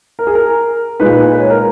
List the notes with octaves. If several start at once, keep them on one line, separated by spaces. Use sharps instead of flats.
A#4
G#4
A#4
A#2 G#3 D#4 B4
B4
C#5
A#4